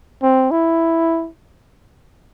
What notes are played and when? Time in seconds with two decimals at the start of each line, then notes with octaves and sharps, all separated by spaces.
0.23 C4
0.51 E4